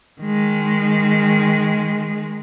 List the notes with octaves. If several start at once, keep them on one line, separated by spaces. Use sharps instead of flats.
D#3 G#3